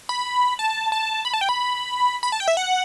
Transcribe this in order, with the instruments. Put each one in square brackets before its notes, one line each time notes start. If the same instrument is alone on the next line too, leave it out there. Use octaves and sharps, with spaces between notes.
[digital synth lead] B5
A5
A5
B5
A5
G5
B5
B5
A5
G5
E5
F#5